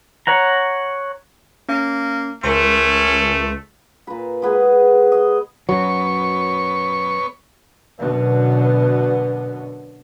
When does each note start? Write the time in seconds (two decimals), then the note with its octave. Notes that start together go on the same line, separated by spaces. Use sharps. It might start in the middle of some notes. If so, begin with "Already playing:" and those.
0.27 C#5 F#5 A#5
1.69 A#3 C#4
2.43 C#2 A3 C#4 A#4 C6
4.07 A#2 B4
4.42 G#3 B3 G#4
5.12 D#5
5.69 F#2 F#3 B3 C#5 C#6
7.98 F#2 B2 D3 B3